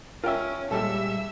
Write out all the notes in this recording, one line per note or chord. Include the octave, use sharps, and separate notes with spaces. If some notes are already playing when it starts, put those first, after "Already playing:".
C#4 F4 A#4 E5 G5
A#2 G3 G#3 G4 A4 E5 E6